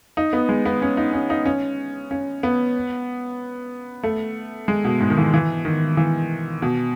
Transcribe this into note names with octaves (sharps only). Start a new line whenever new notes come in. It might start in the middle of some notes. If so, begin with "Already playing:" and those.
D#4
B3
G#3
B3
C#4
D#4
C#4
D#4
C#4
C#4
B3
A3
G#3
B2
G#2
D#3
E3
E3
D#3
E3
B2